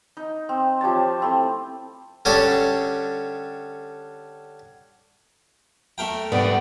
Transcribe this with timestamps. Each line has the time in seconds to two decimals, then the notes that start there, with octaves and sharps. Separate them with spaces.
0.17 D#4
0.49 C4
0.81 F3 G4 C#5 A5
1.20 A3 C4 E4
2.25 D3 G3 C#4 D4 A4 D#6
5.98 A3 A#4 G5
6.32 G#2 G3 B3 D5